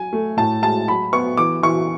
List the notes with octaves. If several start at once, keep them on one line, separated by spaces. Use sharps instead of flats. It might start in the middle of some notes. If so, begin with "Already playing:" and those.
Already playing: F#3 G#5
A3
A2 A5
G#3 A5
F#3 B5
B3 C#6
E3 D6
E3 C#6